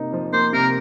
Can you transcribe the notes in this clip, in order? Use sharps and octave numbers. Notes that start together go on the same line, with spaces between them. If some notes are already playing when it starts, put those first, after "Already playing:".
Already playing: C3 A#3 D#4
F3
A#3 C5
C3 A#4